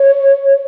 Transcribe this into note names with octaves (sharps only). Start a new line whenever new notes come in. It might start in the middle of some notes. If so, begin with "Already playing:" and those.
Already playing: C#5